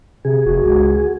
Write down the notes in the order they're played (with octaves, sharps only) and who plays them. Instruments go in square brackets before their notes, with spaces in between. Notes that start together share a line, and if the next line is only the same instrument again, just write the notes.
[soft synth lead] C3 [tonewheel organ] G#4
[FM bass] F1 [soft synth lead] F#4
[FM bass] C#2